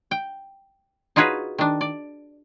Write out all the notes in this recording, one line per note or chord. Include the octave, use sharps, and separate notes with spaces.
G5
D#4 F4 F#4 G#4 B4 C#5
D#3 D4
D5